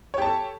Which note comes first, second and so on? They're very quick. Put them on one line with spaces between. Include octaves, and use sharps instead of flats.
C#5 G4 A5 A4